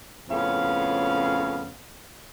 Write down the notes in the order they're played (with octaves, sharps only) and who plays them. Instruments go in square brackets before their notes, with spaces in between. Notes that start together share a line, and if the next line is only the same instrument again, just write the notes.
[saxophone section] F2 A2 C#3 B3 C#4 F5